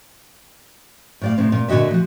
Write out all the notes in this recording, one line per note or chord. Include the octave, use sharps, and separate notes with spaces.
A2 D5 F5
A2 C3 C4
A#2
A#2 D3 F#4 D#5 E5
F3 F#4